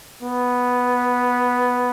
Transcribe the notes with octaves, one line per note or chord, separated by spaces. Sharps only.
B3